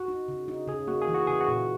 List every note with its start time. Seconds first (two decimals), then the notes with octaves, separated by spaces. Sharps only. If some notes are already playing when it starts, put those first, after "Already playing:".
Already playing: F#4
0.08 D#4
0.28 C#3
0.48 D#4
0.68 C#3 G#4
0.87 A#3 F#4
1.02 G#4
1.08 E3
1.14 F#4
1.27 C#3 G#4
1.41 F#4
1.48 A#2